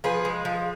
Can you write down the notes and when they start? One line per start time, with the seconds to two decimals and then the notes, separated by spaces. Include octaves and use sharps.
0.04 F3 G#4 B4
0.25 G#3
0.45 F3